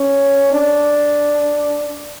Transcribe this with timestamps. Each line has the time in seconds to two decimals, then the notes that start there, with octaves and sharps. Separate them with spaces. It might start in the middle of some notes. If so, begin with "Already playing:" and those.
Already playing: C#4
0.53 D4